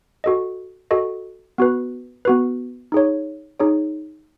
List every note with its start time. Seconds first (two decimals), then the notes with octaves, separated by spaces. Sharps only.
0.24 F#4 A4 D#5
0.91 F#4 A4 D#5
1.58 B3 F#4 B4
2.25 B3 F#4 B4
2.92 D#4 G#4 C#5
3.60 D#4 G#4 C#5